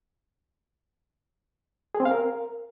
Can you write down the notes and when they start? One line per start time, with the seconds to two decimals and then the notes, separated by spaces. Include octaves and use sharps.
1.95 G#4
2.00 C4
2.05 F5
2.11 A#4